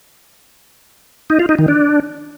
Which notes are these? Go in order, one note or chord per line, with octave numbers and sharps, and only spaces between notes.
D#4
F4
D#4
D#3
D4